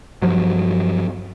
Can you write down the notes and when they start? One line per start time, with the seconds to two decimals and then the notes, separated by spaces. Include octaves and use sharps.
0.22 G2 F3 F#3